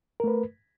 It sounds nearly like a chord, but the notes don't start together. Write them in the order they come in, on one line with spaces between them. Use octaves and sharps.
A#4 A3 B4